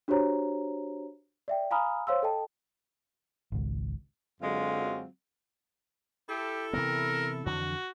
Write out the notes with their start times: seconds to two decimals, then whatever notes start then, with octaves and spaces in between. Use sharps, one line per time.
0.08 D4 F#4 G4 C5 C#5 A#5
1.48 D5 E5 G5
1.71 F5 G#5 A#5 B5 D#6 F6
2.07 C5 C#5 F5 C6 E6
2.23 A4 D#5 G5 A5
3.52 G#1 C#2
4.41 F#2 D3 F#3 G#3 C4 F4
6.29 E4 G4 A4
6.73 C3 E3 B3 A#4
7.46 F2 D3 E3 F#4